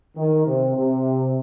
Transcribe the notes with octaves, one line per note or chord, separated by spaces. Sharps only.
D#3
C3
C3